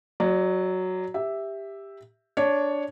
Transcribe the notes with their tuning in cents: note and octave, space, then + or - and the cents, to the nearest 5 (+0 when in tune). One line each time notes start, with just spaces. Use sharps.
F#3 +0 D5 +35
G4 +10 E5 +0
D4 -10 C#5 +0